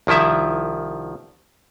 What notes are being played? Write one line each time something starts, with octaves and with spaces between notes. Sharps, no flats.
C2 D#3 F3 E4 E5